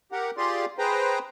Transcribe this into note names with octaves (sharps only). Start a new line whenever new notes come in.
G4 A#4 F#5
F4 G4 G#4 D5 C6
G#4 B4 C5 G5 A#5